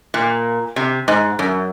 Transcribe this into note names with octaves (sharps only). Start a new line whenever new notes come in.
A#2
C3
G#2
F#2